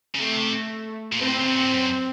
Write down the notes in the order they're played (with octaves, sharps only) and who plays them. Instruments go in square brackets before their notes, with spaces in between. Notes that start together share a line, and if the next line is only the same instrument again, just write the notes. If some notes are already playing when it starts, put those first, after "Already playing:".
[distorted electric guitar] C#3
[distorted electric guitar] C3 [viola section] A3
[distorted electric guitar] A#2
[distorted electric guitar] A2 [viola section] C4
[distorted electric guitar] C#3
C3
A#2
A2
F#2